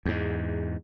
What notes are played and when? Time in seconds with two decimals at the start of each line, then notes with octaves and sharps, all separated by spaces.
0.05 E2 G#2